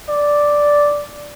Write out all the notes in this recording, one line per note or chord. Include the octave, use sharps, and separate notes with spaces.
D5